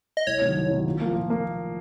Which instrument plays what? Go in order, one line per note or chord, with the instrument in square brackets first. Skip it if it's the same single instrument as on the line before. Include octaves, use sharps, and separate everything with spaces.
[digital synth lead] D#5
[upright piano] C2 [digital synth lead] C#5
[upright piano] C3 D#3 F#3
C2
C3 D#3 F#3
A#2
F3 A#3
A#2
A#3